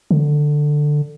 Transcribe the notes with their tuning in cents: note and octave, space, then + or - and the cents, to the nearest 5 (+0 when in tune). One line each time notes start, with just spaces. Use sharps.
D3 +10